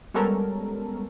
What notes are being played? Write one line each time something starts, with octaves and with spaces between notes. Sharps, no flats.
G3 G#3 B3 C#4 A4 A#4